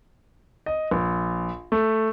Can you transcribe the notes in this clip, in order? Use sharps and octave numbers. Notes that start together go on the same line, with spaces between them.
D#5
A#1
A3